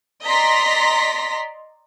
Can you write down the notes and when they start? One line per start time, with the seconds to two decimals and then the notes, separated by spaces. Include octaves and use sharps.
0.24 D5 D#5 A#5 C6 A#6 B6